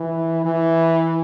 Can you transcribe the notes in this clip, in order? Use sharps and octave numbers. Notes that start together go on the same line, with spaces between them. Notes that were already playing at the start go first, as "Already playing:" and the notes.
Already playing: E3
E3